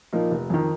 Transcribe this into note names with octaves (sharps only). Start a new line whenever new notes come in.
A#2 F3 A#3 D#4
F1
F2 D#3